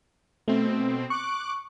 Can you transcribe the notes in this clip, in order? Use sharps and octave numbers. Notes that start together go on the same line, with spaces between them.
B2 A3 C4
C#6 D6 F#6